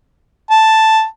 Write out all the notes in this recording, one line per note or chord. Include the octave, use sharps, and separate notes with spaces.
A5